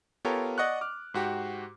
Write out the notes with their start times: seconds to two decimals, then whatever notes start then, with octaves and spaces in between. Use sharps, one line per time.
0.25 B3 F4 G4 A4 A#4 C#5
0.58 D5 D#5 F#5 C#6 F#6
0.81 D6 F6
1.14 G#2 F#4 G4